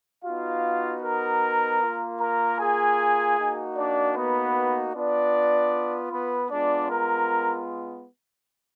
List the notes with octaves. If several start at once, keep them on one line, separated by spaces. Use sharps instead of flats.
B3 D#4 F4 F#4 F5
A#4 A#5
A#3 F4
A#4 A#5
G#4 G#5
A#3 D#4 F#4
D4 D5
B3 B4
B3 D4 F4 D5
B3 B4
G#3 B3 D4 F4 D5
A#4 A#5